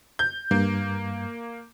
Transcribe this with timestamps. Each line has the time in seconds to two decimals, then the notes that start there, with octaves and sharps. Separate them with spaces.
0.19 G6
0.51 G2 A#3